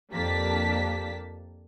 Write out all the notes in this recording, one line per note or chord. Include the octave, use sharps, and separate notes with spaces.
F2 A#3 D4 G4 A5 B6